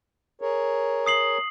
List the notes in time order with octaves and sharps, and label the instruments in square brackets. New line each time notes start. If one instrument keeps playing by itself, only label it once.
[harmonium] G#4 A#4 C#5
[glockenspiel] D#6 C7 F#7